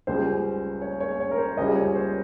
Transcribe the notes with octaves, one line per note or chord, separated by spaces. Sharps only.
C#2 C#3 G3 C5
C#5
C#5
C#5
A#4
C5
C#2 C#3 G3 D#5
C#5
C5